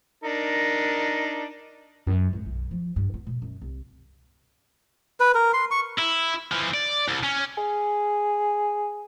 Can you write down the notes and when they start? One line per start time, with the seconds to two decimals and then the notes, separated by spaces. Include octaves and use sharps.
0.24 D4 D#4 A#4
2.07 F#2
2.33 G#1
2.46 B1
2.71 F3
2.96 G2
3.14 B3
3.27 B2
3.42 F#2
3.62 C2
5.20 B4
5.35 A#4
5.53 C6
5.71 C#6
5.99 E4
6.52 E3 F3
6.74 D5
7.08 C2
7.23 C#4
7.58 G#4